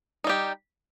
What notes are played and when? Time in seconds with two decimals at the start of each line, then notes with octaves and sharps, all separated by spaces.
0.24 D#4
0.27 G3
0.29 G4